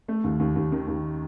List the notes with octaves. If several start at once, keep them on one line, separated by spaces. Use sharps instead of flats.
A3
D#2
D#2
D#2
D#3
D#2